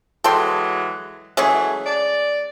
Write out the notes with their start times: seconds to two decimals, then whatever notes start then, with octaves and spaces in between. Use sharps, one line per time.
0.24 E3 F#3 G#3 A4 G5 C6
1.37 E3 F#3 G#3 A3 C#4 G#4
1.86 D5